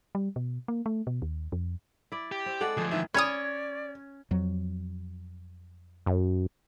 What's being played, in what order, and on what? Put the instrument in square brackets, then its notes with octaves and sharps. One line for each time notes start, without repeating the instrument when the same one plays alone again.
[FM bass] G3
B2
A#3
A3
B2
D#2
F2
[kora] E4 D5
[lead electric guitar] G4
[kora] C4
[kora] G#3 D5 F#5 [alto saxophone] A4
[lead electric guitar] D2 F3 [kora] G#4
[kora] D#3 E3 [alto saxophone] E5
[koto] C#4 C#5 [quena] D5 [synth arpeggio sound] B5 D#6 [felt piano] G#6
[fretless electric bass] F2 F#3
[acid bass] F#2